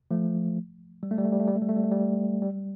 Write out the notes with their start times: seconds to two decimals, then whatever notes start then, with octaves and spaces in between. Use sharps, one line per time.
0.11 F3 A3
1.03 G3
1.11 A3
1.18 G3
1.25 A3
1.32 G3
1.40 A3
1.48 G3
1.55 A3
1.62 G3
1.69 A3
1.76 G3
1.84 A3
1.91 G3
2.42 G3